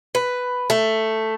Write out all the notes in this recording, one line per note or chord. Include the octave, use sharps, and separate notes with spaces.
B4
A3